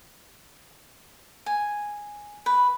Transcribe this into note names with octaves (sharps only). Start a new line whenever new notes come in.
G#5
B4